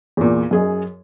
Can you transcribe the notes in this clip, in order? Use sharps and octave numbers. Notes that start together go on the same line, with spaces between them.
E2 A#2
F#2 G#4 D#5